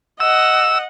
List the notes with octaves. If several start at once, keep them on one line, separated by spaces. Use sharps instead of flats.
D#5 F#5 E6